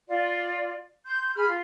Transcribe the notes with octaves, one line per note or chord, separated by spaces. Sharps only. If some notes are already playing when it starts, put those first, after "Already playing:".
F4 D5
C6 G6
G#4 B5 F6
F4